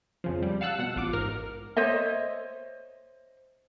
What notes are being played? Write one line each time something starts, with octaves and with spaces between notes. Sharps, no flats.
F2 C#3 F3
G3
F5 F#5 A5 E6 F#6
B2 F#5
A1 F4 D6
G#2 A#4 F6
C5 C#5 D#5 E5